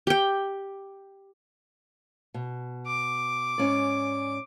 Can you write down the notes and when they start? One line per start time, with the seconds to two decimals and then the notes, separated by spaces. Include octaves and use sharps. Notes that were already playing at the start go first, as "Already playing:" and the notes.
0.07 G4 G5
2.34 B2
2.87 D6
3.58 G#2 C#4 D5